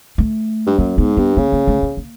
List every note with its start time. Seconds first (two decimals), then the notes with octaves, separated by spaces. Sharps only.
0.18 A3
0.66 G2
0.79 F#2 A#3
0.98 G#2 B3
1.17 G2 B3
1.37 C#3 A#3
1.52 A#3
1.68 A3
1.82 A#3
1.97 A#3